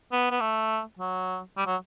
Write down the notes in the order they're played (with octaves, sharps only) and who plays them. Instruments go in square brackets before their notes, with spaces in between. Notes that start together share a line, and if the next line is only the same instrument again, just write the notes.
[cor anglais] B3
B3
A3
F#3
G3
F#3